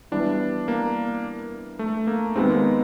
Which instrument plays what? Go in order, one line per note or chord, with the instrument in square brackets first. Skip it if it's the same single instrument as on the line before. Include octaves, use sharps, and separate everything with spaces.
[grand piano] E3 G3 B3 E4 [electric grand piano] D4
[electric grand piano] A#3
A3
A#3
[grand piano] D#3 G#3 B3 [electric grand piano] C4
[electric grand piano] A#3